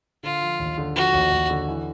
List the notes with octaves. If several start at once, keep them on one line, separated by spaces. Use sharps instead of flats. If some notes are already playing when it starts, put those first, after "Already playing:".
D3 F4
F3
D#2
D3
F3 F#4
D#2
D#2
D3
E3